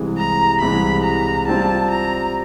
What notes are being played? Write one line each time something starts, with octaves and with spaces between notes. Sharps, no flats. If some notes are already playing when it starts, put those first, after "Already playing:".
Already playing: C2 C3 E3 G#3
A#5
C2 C3 E3 G#3 B5
A#5
G3 C4 F4 A5
A#5